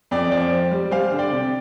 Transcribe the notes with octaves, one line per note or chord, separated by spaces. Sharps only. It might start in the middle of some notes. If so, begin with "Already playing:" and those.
F2 D5 G5
F3 D5 G5
C4
G3
G3 C5 F5
D3
D5 G5
C3